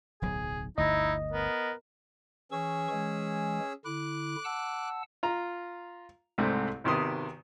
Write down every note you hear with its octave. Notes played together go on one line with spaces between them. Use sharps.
D1 B1 F#3 G#4
G1 D2 D#4 E4 D#5
B3 A#4
E3 C#4 G#4 C#6 E6
E3 G#3
D3 E4 D6 F#6
F#5 A5 E6
F4 A#5
C2 G#2 A3 C4
G#1 C3 D#3 B3 C6 D#6